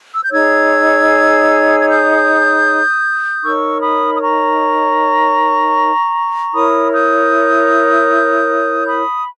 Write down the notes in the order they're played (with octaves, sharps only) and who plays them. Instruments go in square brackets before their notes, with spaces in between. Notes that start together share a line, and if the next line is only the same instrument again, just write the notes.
[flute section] E6
G6
D#4 G#4 C#5 E6 G#6
G#6
D#6 G6
D#4 A#4 C#5 C#6 E6
B5 D#6
D#6
A#5 C#6
E4 A#4 C#5 B5 D#6
D#6 G6
B5 D#6